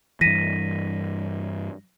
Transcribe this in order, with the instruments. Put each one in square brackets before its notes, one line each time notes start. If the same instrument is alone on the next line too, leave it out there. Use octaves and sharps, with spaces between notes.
[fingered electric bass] G2 E3 [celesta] A#6 B6 D#7